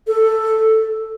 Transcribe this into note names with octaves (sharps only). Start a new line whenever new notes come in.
A4